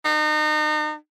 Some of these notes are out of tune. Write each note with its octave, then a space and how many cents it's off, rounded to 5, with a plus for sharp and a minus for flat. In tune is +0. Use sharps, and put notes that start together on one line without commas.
D#4 -35